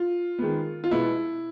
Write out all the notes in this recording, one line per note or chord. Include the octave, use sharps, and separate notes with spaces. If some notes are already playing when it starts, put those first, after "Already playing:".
Already playing: F4
D#3 G#3 B3
F4
B2 G#3 B3 E4